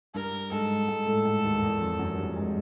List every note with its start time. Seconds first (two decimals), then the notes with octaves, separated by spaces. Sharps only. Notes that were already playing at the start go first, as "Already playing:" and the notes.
0.14 G2 G3 A#4
0.51 G#2 G#3 A4
0.88 G#2 G#3
1.07 A2 A3
1.25 G#2 G#3
1.44 D#2 D#3
1.62 E2 E3
1.81 F2 F3
1.99 F#2 F#3
2.17 G2 G3
2.36 G#3